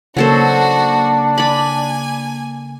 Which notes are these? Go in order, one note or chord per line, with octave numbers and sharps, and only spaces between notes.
C#3 F#3 A#3 D4 F#4 A4 C5
D5 G#5 B5